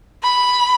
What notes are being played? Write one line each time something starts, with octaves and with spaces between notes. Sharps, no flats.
B5